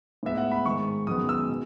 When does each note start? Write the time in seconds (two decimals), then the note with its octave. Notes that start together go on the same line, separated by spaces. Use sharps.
0.23 A2 G#3 B3 E5
0.38 F#5
0.52 B5
0.65 G#2 D#3 G#3 C#6
1.07 F#2 D#3 G#3 B3 D#6
1.29 E6
1.49 B2